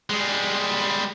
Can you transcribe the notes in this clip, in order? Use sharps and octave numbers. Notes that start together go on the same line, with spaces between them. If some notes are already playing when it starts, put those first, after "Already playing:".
G3 G#3